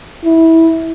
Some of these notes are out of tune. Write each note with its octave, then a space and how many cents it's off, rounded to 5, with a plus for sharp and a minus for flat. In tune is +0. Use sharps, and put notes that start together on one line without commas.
E4 -15